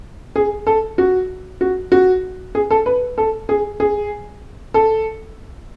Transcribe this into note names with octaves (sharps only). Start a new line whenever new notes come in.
G#4
A4
F#4
F#4
F#4
G#4
A4
B4
A4
G#4
G#4
A4